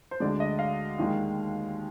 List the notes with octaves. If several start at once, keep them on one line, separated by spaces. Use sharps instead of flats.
C5
D2 D3 G#3 D5
D#5
F5
D#2 D#3 G#3